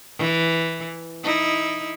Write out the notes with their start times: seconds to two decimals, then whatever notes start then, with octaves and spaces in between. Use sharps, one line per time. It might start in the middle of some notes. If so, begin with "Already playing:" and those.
0.18 E3
1.24 D#4 E4